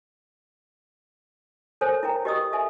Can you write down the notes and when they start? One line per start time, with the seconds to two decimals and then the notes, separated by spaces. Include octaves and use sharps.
1.81 A4 A#4 C5 C#5 G#5
2.03 E4 A#4 G5 A#5
2.25 G4 A#4 D#5 C#6 D#6 E6
2.52 A4 E5 G#5